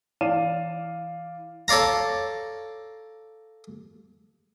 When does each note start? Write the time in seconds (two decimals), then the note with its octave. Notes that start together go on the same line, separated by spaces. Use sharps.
0.21 E3 D5 F5 D#7 E7
1.68 A4 C#5 D5 F5 A#5